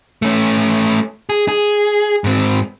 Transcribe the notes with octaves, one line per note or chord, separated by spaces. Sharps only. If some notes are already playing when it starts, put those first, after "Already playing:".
A3 C#4
G#4
G#4
G#2 C4